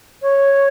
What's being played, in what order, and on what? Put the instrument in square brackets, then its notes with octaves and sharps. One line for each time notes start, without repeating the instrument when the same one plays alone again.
[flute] C#5